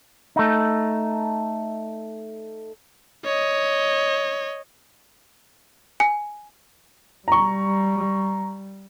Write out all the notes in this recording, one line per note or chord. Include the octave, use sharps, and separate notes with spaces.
A3 D#4
C#5 D#5
G#5
G3 A#5 C#6